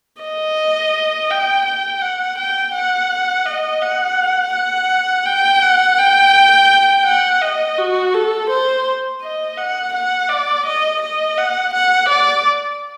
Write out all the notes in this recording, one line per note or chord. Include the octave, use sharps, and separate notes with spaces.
D#5
G5
G5
F#5
G5
F#5
D#5
F#5
F#5
G5
F#5
G5
F#5
D#5
F#4
A4
C5
D#5
F#5
F#5
D5
D#5
D#5
F#5
F#5
D5